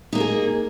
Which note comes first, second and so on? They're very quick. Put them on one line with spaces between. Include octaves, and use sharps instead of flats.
D#4 A#3 A#4 G#4